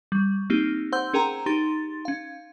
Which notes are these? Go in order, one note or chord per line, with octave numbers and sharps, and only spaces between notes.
G3
A#3 C4 D#4 G4
C5 F#5 C6 E6 G6
C#4 G#4 A#4 G5 A#5
D#4 G4 C6 A6
C#4 F5